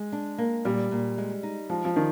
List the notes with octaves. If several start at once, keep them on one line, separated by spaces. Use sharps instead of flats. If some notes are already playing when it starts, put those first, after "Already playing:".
Already playing: G#3
D4
A#3
A#2 G3
A#2
G#3
D#4
F3 G#3
F3
D#3 D4